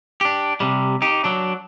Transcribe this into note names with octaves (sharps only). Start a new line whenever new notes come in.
D4 G4
C3 G3
D#4 G4
F#3 D4